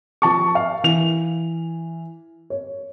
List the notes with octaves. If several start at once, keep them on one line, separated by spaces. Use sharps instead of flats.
F3 A5 C#6
F5
E3 F7
C#5